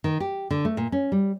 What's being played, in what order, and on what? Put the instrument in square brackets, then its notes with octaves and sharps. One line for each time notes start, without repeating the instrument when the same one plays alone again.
[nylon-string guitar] D#3
G4
D3
A3
A#2
C#4
G3